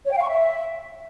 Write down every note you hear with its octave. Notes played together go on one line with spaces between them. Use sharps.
C#5
G5
F5
C#6
E5